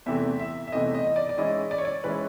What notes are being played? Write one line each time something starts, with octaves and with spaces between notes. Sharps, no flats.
E2 C3 E3 A3 C4 E5
E5
E5
E2 C3 E3 A3 C4 D#5
D#5
D#5
D5
D5
E3 G#3 C#4 E4 D#5
D5
C#5
D5
E3 G#3 C#4 E4 B4